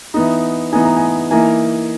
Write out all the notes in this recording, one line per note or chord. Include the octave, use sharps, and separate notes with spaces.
E3 B3 D#4
E3 B3 D#4 G#5
A#5
G#5
E3 A#3 D#4 G#5